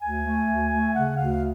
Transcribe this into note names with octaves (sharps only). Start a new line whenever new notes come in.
D2 G#5
A3
D2
A3
C#3 F#5
D2 F5